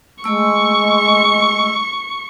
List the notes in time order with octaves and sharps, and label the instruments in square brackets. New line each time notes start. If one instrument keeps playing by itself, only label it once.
[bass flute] G#3 [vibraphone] A3 E6 [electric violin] C#6